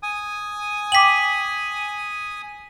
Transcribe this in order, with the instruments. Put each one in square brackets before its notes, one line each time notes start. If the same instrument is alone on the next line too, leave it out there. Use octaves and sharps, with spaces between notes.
[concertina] G#5 D#6
[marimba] G5 D6 [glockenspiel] B6 F#7